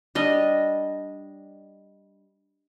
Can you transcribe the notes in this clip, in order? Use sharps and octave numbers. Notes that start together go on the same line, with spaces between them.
G3 D4 D#5